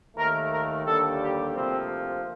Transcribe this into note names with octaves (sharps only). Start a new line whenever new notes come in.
D#2 D#3 A3 A#4
A#4
D#2 D3 G3 A#3 A4
G4
D2 C3 F3 A#3 C4